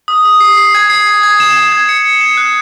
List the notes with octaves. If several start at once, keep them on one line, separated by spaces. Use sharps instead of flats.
D#6
D#6
C7
C7
G#6
C7
G#6
G#6
E7
G#6
G#6
C#7
C#7
E7
F#6